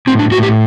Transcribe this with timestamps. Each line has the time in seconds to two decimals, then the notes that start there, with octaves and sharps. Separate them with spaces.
0.07 A2 C4
0.19 D4
0.31 A2 F#4
0.43 G4